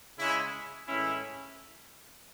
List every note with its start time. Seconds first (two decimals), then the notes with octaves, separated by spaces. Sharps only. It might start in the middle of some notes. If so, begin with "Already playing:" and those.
0.18 C#3 G#3 C#4 E4
0.87 A2 E3 G#3 C#4 E4